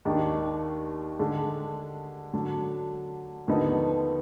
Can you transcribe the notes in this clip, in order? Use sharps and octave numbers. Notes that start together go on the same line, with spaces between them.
D#2 D#3 G#3 D4
D3 G#3 D4
D3 F#3 D4
D#2 D3 F3 B3 D#4